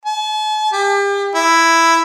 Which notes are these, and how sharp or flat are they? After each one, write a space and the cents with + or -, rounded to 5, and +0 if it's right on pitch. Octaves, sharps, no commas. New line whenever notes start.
A5 -45
G4 +35
E4 +5